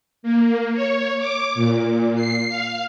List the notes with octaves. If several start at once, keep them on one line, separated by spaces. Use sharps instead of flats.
A#3
C#5
D6
A#2
C7
F5